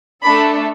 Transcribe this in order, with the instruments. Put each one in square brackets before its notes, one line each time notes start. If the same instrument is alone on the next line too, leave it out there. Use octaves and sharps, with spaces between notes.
[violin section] A3 D4 A4 B5